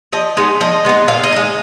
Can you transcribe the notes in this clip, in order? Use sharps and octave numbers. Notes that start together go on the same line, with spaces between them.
F3 D#5
G#3 B3 D#4
F3 D#5
G#3 B3 D#4
A#2 F5
D#5
G#3 D#4